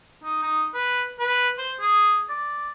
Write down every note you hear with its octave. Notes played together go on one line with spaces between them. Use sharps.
D#4
D#4
B4
B4
C5
G#4
D5